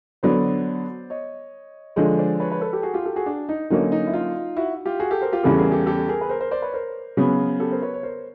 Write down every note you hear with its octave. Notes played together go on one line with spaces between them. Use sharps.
D3 F#3 B3 C5 D5
C#5 D#5
D3 F3 G#3 C#5 D#5
C5 D5
B4 C#5
B4 C#5
A4 B4
G4 A4
F#4 G#4
F4 G4
G4 A4
F#4 G#4
D4
D#4
D3 F#3 A#3 C#4 D#4
D#4
E4
D#4 F4
E4 F#4
F4 G4
F#4 G#4
G4 A4
A#4 C5
F4 G4
E2 C#3 E3 G3 B3 G4 A4
G#4 A#4
G4 A4
G4 A4
G#4 A#4
B4
A#4 C5
A#4 C5
C5 D5
B4 C#5
A#4 C5
C#3 F#3 B3
G4 A4
A#4 C5
B4 C#5
C#5
A#4 C5